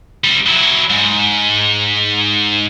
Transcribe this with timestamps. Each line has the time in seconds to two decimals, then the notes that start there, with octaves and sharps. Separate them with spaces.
0.24 G3 C4
0.46 F#3 E4
0.90 G#2